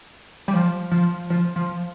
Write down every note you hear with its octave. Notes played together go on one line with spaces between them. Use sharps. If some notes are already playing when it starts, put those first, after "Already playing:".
G3
F3
F3
F3
F3